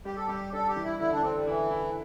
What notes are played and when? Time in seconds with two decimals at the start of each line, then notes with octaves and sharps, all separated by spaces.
0.05 G3 G4
0.16 A4
0.27 G3 G4
0.53 D4 A4
0.68 G4
0.76 E3
0.84 E4
1.00 D3 E4
1.12 D4
1.23 D3 C4
1.35 G3
1.47 E3 E4
1.71 E4